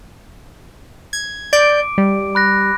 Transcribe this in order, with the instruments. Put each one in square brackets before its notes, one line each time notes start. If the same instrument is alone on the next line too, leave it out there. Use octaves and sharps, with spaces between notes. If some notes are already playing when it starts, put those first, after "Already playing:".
[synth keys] G#6
[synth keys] D5 G6 [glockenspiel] D6 D7
[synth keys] G3
[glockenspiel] B5 F#6 A#6